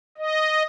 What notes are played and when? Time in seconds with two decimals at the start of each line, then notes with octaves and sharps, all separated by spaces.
0.18 D#5